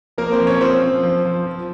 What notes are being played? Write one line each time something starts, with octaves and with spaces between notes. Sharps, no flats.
F3 A#3 A#4
C4 C5
F3
C#4 C#5
F3 C4 C5
F3
F3
F3
F3